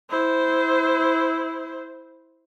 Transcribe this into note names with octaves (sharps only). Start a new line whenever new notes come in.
E4 C5